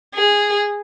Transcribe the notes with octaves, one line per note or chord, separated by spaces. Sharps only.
G#4